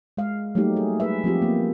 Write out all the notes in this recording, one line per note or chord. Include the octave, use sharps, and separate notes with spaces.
G#3 F5
F#3 G3 A3 A#3 D#4 G4
G#4
G#4 B4 E5
F3 C4 F4 G4
A#3 B3